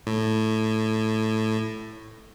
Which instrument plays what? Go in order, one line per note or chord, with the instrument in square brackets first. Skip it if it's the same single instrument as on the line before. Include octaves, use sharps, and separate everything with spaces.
[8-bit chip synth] A2